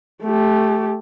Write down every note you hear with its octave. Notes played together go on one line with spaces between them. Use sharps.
A3 G4